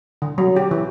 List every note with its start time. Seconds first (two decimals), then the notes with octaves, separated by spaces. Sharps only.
0.22 D3
0.38 F#3
0.56 G4
0.71 E3